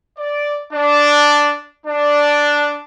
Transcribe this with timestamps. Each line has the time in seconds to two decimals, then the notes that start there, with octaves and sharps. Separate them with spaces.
0.17 D5
0.73 D4
1.86 D4